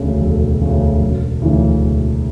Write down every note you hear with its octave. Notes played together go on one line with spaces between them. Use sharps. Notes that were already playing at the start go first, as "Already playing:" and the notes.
Already playing: E1 D2 C#3
E1 A4
D2 C#3
E1
D2 C#3 E3
E1